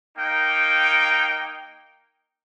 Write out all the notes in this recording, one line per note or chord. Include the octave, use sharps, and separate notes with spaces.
A#3 D#4 G5